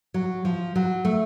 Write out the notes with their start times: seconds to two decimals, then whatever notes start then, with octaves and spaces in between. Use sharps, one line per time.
0.14 F#3
0.45 F3
0.76 F#3
1.05 A3